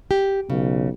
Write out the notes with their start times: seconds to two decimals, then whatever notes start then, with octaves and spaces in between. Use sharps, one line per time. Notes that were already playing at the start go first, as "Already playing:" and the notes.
0.11 G4
0.50 B1 C#3